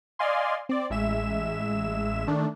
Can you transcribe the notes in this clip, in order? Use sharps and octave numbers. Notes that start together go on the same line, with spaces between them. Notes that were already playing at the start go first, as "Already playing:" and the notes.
D5 D#5 F5 G#5 C6
C4 D5
A1 G#3 E5 E7
D#3 A3 D4